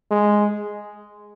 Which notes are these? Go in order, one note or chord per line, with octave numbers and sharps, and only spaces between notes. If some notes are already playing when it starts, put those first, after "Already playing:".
G#3